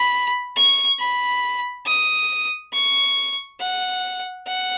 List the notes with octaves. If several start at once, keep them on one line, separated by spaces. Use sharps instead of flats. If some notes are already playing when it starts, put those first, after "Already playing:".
Already playing: B5
C#6
B5
D#6
C#6
F#5
F#5